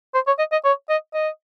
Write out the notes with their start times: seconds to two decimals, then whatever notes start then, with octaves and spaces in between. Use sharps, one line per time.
0.14 C5
0.27 C#5
0.39 D#5
0.52 D#5
0.64 C#5
0.89 D#5
1.14 D#5